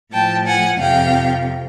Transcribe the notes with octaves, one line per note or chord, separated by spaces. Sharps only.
A2 F3 G5 A5
F#5 G#5
F2 C3 F3 F5 G5